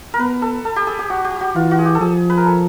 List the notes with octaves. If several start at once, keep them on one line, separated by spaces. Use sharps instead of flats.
A#4
B3 B4
A4
A4
G4
G#4
G4
F#4
G4
F#4
E3 F4
F#4
G#4
G4
A4
F3 G#4
B4
A#4
A4